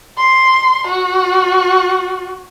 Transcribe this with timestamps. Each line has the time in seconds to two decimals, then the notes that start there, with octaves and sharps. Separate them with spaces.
0.17 C6
0.87 F#4